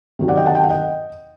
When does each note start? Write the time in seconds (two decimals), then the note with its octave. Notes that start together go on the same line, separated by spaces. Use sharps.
0.19 C3 D#3 F#3
0.28 D5 F#5
0.37 D#5 G5
0.46 F#5 A5
0.55 G5
0.64 F#5
0.70 D#5 G5